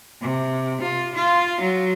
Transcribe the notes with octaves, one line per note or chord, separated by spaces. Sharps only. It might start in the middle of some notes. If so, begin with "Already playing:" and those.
C3
F4
F4
F#3